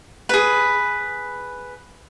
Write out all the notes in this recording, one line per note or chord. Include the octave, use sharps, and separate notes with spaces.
G#4 B4